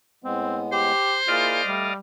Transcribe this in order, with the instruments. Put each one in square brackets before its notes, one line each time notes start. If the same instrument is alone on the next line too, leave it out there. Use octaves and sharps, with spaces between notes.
[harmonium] A2 G#3 B3 [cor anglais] C4
[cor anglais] G4 [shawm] C5
[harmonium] A#3 E4 G#4 [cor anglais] F4 [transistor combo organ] D5 D#5 F5
[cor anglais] G3 [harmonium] A3